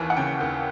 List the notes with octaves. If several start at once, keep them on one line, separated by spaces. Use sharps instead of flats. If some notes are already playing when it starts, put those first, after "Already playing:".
Already playing: D#2 E3
F#5
C#3 G5
D#2